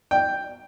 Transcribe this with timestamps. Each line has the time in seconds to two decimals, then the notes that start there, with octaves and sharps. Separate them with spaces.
0.11 G5